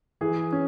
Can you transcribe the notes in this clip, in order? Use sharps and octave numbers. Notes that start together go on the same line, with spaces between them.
E3 G#4
C#4